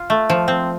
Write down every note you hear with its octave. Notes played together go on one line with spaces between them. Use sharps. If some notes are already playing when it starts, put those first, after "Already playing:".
Already playing: F4
A3
F3
C4